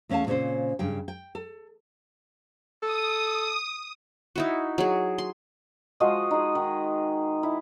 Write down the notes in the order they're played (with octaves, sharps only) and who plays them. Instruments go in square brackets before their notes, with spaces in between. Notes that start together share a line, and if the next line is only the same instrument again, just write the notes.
[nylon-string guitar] E2 A3 C#4 D#5 F5 A5
A#2 C#3 C4 C#4 C5
G2 C#3 G5
G5
A4
[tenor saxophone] A4 [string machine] D#6
[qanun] D#4 E4 F#4
F#3 G#4
C6
[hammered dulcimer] F3 G#3 F#4 D#5
D#4 G#4
D#3
E4